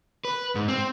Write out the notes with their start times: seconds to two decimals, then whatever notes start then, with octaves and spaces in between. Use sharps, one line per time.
0.25 B4
0.55 G#2
0.68 C4